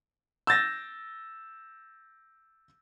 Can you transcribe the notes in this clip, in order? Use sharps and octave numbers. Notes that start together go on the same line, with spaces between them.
E6 G6 A6 A#6